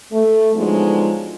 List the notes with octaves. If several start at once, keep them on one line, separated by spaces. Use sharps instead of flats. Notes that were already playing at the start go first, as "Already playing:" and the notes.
A3
D3 F3 F#3 G#3 B3 D#4